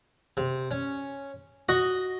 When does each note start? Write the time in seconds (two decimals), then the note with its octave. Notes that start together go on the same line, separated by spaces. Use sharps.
0.37 C3
0.71 C#4
1.69 F#4 D#5